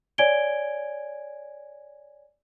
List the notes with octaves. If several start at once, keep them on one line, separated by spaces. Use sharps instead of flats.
C#5 D5 G#5 G#6 D7 G7